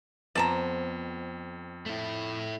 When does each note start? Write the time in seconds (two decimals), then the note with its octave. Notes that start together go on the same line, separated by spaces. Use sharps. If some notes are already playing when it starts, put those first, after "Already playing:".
0.35 F2 B3 C4 D5 A5 A#5
1.86 A3 E4